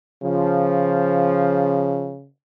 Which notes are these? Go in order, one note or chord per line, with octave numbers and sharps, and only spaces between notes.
C#3 F3